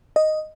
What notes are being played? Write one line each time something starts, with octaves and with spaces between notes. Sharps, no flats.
D#5